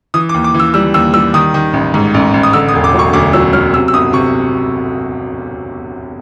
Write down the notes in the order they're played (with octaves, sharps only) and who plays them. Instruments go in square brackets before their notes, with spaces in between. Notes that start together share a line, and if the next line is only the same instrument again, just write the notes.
[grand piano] E3 D#6
D6
D#2
D6
E3
E6
G3 E6
D#2 E6
G3 E6
D#3 D#6
D#3
A1
G#2
A1
A1
D#6
D3 E6
D#6
E1
D6
F#3 C#6
D2 D6
F#3 E6
F#3 F6
C3 E6
E6
G1 D#6
C3 C#6